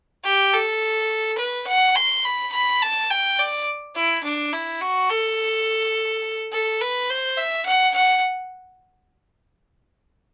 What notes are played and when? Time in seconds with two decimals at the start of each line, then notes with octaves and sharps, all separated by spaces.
0.25 G4
0.54 A4
1.38 B4
1.68 F#5
1.96 C6
2.25 B5
2.53 B5
2.82 A5
3.10 G5
3.39 D5
3.96 E4
4.24 D4
4.53 E4
4.81 F#4
5.10 A4
6.53 A4
6.81 B4
7.10 C5
7.38 E5
7.66 F#5
7.95 F#5